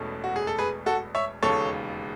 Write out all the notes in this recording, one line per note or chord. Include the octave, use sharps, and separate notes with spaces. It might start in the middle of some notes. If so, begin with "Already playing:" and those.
Already playing: E1 E2 B2 A3 C#4
F#4
G#4
A4
G#4 B4
F#4 A4
C#5 E5
E1 D#2 C#3 A4 C#5